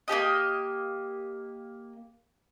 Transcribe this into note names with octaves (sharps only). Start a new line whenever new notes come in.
A#3 D#4 G4 D#5